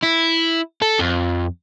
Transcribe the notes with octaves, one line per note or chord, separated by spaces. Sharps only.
E4
A4
F2